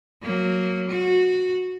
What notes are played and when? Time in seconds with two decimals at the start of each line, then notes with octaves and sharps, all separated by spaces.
0.23 F#3 A#3
0.90 F#4